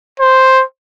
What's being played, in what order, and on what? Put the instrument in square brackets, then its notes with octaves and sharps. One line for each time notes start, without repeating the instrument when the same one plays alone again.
[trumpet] C5